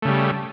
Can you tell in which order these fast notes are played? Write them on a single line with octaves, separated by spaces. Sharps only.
A3 C#3 G3